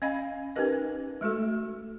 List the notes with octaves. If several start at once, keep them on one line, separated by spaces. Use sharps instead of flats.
C#4 D#5 F5 G#5 B5
C#4 D#4 G4 A#4 B4 D#5
G#3 A3 F#4 A4